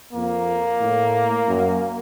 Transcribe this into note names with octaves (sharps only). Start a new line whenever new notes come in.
F2 A#3
A2
F#2